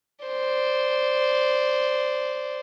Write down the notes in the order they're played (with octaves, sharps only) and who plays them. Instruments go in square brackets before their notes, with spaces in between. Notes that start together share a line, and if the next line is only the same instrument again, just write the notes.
[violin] C5 D5